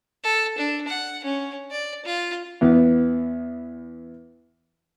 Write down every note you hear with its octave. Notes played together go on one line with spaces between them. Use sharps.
A4
D4
F#5
C#4
D5
F4
E2 B3